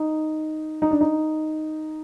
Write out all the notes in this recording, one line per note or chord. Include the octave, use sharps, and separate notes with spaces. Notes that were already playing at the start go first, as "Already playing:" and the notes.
Already playing: D#4
D#4
D4
D#4